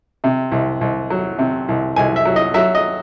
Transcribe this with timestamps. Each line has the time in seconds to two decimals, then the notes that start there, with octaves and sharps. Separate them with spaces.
0.24 C3
0.52 C2
0.81 C2
1.10 F#3
1.39 C3
1.68 C2
1.96 C2 G#5
2.16 E5
2.25 F#3
2.36 D#5
2.54 F#3 E5
2.75 D#5